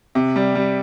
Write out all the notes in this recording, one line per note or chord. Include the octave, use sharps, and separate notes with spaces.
C3
G3
G3